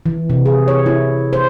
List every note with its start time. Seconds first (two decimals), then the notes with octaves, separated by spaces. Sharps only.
0.06 E3
0.30 C3
0.46 G#4
0.68 C#5
0.86 E4
1.33 C5